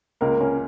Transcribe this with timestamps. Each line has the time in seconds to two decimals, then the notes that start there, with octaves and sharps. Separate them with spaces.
0.21 C#2 A#3 A#4
0.41 A#3 C#4 A#4